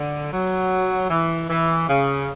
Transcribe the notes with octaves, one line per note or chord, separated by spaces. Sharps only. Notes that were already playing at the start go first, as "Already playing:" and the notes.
Already playing: D3
F#3
E3
E3
C#3